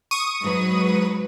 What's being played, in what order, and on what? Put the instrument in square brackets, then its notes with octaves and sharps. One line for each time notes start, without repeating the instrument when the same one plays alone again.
[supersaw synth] C#6 D#6 D#7
[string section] G#2 F#3 B4